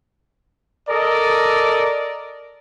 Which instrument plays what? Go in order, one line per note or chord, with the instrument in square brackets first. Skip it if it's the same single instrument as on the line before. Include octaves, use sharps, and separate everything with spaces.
[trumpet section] A4 A#4 D5 D#5